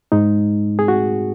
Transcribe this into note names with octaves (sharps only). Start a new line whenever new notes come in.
G#2 G#3 D#4
G#4
F#4